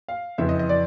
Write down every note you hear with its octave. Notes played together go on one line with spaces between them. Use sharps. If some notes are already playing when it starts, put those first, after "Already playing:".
F5
F2 C#3 E3 E5
D#5
D#5
D5